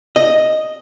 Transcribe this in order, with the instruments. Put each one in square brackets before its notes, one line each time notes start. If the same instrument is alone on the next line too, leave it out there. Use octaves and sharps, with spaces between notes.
[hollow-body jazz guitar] D#5